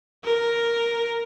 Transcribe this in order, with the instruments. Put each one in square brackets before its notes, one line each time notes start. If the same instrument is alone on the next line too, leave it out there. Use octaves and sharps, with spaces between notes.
[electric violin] A#4